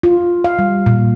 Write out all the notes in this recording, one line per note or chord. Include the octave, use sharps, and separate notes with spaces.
F4
F5
G3
A#2